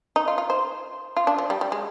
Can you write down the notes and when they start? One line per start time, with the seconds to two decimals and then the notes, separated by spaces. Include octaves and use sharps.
0.16 D#4
0.28 F4
0.38 F4
0.50 C5
1.17 F4
1.27 D4
1.38 F3
1.50 G3
1.61 G3
1.72 G#3